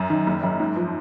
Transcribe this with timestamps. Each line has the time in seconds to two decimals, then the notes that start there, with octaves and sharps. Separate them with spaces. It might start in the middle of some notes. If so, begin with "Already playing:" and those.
Already playing: F#2
0.10 D#3
0.27 F#1
0.43 F#2
0.60 G#2
0.76 F3